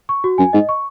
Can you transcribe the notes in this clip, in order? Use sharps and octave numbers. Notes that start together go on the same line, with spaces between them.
C#6
F#4
F#2 G#5
G#2 D#5
C#6